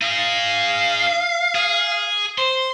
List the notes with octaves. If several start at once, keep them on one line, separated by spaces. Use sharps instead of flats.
D#4 G#4 F5
G#4
C5 C6